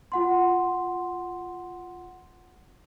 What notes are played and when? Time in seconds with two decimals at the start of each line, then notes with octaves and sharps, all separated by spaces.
0.12 F4 F#5 C6